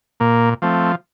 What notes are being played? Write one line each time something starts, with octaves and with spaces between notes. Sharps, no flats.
A#2 A#3
F3 A3 C4